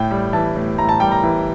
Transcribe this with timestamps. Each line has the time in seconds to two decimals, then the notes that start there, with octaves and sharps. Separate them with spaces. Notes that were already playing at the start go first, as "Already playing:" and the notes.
Already playing: A2 G5
0.11 G3
0.33 E3 A5
0.56 A2
0.78 A2 A#5
0.89 A5
1.00 G3 G5
1.12 A#5
1.23 E3